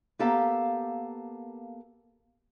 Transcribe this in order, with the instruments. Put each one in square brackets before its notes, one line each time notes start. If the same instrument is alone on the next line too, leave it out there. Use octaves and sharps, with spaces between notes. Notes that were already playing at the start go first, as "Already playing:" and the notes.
[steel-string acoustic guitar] A#3 B3 G4 A4 F5 A#5